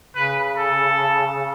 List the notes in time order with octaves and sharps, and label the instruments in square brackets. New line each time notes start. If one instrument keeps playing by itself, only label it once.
[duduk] C#3 [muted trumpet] B4
[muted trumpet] A4